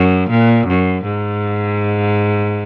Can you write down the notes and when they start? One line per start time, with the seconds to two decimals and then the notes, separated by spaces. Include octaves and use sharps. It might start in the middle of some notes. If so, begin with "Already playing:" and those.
Already playing: F#2
0.30 A#2
0.67 F#2
1.04 G#2